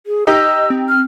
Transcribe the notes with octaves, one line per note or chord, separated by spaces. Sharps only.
G#4
D#4 G4 D#5 E6
C4
F6